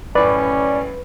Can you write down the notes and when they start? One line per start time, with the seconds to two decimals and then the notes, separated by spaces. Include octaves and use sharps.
0.15 F#2 A2 C#4 B4 D5